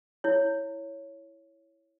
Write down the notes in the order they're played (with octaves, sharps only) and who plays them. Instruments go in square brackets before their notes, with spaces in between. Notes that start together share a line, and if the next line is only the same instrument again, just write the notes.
[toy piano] E4 C#5